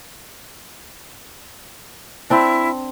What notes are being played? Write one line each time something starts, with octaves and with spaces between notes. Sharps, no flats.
C4 D4 E4